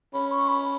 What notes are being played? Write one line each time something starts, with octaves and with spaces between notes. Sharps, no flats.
C#4 B5
C#6
B5